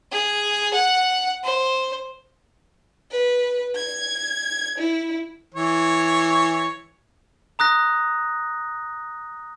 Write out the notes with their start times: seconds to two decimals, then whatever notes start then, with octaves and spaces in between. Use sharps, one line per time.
0.12 G#4
0.73 F#5
1.44 C5
3.12 B4
3.76 G#6
4.79 E4
5.55 E3 C#5
7.59 A#5 D#6 F#6 A#6